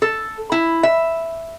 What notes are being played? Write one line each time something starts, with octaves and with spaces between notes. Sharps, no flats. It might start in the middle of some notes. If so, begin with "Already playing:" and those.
A4
E4
E5